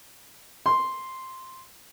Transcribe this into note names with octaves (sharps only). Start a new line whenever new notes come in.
C6